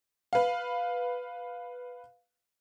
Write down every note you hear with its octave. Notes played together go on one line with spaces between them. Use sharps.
B4 F5